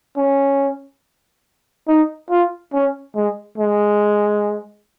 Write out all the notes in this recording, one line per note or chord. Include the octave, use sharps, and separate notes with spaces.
C#4
D#4
F4
C#4
G#3
G#3